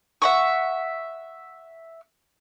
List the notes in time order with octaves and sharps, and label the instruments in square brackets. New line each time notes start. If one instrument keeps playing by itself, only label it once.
[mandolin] E5 F#5 C#6